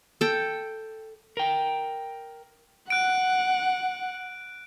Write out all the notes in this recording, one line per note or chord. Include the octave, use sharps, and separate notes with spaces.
A4 G5
A#4 G5
F#5 F#6 D7